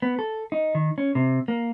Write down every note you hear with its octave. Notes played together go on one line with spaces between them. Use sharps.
B3
A4
D#4
D#3
C#4
C3
A#3